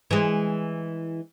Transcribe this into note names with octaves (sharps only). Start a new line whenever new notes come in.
E3 G#3